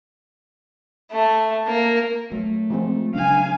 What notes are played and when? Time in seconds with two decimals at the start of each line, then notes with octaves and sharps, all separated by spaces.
1.12 A3
1.67 A#3
2.32 F#3 A3
2.70 F3 G#3 C4
3.15 C#3 F#3 D4 F5 G#5